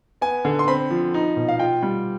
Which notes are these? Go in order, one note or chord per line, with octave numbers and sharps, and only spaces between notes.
B3 G#5
D3
C6
C4 B5
F3
D#4
B2
F5
F4 G5
G3